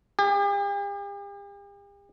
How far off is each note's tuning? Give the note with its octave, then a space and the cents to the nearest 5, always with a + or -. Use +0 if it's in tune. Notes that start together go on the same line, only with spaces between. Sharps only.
G4 +45